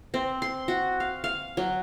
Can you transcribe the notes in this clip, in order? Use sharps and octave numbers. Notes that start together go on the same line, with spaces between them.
C4
C6
F#4
F5
F5
F#3